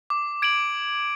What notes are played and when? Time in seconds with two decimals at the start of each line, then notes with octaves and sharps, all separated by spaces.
0.10 D6
0.42 G#6 D7 F#7